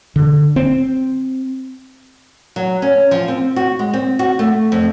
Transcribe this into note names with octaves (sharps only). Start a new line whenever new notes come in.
D3
C4
F#3
C#4
F3
C4
F#4
G#3
C4
F#4
A3
F2